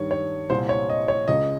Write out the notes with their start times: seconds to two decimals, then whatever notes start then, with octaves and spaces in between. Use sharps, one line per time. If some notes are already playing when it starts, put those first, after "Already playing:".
Already playing: G2 D#3 C#5
0.11 C#5
0.50 C2 A#2 C5
0.69 C#5
0.89 D#5
1.08 C#5
1.28 C#2 C#3 D#5